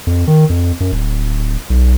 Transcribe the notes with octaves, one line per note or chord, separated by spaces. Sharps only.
F2
D#3
F2
F#2
D1
B1